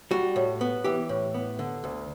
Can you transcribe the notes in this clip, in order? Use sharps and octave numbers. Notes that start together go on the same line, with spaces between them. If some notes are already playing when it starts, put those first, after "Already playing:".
G3 F#4
A2
B3
E3 G4
A2
B3
D3
D2